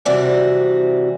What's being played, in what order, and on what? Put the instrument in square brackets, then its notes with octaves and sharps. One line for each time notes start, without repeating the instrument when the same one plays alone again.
[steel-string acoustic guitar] C3 E3 G3 C4 F#4 D5